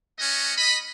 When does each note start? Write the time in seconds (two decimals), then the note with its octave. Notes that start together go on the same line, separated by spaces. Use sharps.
0.19 A3 C#4 F#4 D#5
0.56 D#5 B5